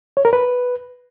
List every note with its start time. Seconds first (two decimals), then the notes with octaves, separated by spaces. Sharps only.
0.17 C#5
0.25 A#4
0.33 B4